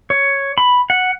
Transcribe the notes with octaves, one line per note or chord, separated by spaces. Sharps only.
C#5
B5
F#5